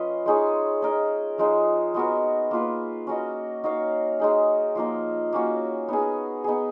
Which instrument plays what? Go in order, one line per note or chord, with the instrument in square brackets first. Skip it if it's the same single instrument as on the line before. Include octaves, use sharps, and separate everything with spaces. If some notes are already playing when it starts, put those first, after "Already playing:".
Already playing: [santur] F3 C#4 F4 B4 D#5
G#3 D#4 G#4 C#5
D#4 A#4 D#5
F3 G#3 D#4
G#3 B3 F#4 A#4
A#3 F4 B4
C#4 F#4 A#4 D#5
D#4 F#4 C#5 F5
G#3 D#4 G#4
F3 A#3 D#4 A#4
A#3 C#4 F#4
B3 D#4 G#4
B3 D#4 G#4